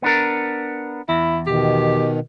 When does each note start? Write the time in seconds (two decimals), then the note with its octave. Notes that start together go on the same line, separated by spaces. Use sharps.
0.02 B3 D4 A#4
1.09 E2 E4
1.47 B2 D#3 G4